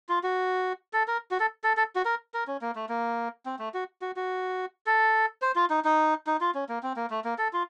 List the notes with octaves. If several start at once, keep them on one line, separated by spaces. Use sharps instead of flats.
F4
F#4
A4
A#4
F#4
A4
A4
A4
F#4
A#4
A#4
C#4
A#3
A3
A#3
C4
A3
F#4
F#4
F#4
A4
C5
F4
D#4
D#4
D#4
F4
C#4
A#3
C4
A#3
A3
A#3
A4
F4